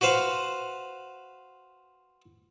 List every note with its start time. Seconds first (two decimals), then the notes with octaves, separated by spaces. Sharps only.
0.01 F#4 B4 C5 F5